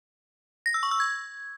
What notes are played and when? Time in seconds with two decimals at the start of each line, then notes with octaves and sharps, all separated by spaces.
0.66 A#6
0.74 E6
0.83 C#6
0.91 E6
1.00 G#6